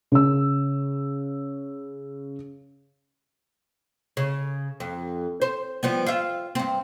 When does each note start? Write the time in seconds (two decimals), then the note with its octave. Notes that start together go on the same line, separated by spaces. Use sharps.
0.12 C#3 E6
4.17 C#3
4.80 F2
5.42 C5
5.83 F3 G3 B3
6.06 F4 E5
6.55 G2 C4